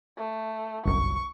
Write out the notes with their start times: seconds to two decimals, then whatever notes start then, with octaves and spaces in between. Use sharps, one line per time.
0.18 A3
0.85 G1 C2 F#2 C#6